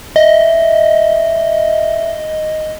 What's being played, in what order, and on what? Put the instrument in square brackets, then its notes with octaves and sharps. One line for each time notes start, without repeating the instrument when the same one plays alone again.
[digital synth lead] D#5 [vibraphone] E5